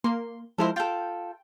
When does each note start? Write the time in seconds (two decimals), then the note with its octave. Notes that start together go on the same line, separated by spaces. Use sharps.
0.04 A#3 C6
0.58 F3 G#3 E4 A4 A#4 C5
0.76 F4 A4 G5